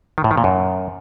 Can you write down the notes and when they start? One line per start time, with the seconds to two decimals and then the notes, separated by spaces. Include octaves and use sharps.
0.18 D#3
0.24 A2
0.31 D#3
0.37 A#2
0.44 F#2